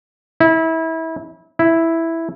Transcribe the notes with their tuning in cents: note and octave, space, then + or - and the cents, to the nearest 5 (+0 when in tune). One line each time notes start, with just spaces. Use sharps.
E4 -25
E4 +0